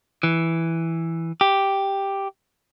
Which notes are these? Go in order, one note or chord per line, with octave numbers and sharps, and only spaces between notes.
E3
G4